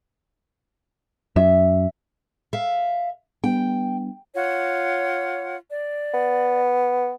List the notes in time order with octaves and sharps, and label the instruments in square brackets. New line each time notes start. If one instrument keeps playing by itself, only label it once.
[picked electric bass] F#2 [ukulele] E5
[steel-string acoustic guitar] E5 F5
[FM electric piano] G3 B3 D4 [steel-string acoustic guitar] G5
[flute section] F4 C#5 F#5
D5
[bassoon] B3